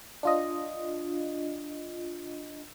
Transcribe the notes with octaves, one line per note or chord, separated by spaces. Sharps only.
D4 F4 D#5